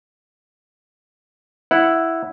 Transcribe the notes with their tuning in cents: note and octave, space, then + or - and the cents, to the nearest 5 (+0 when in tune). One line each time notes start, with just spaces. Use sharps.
E4 +0 F#5 +0